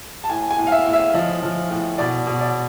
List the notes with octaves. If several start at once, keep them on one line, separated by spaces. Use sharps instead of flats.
A5
A2 G#5
G#5
A2
F5
E5
A2
E5
F3 D#5
F3
A2
B2 D5
B2
D5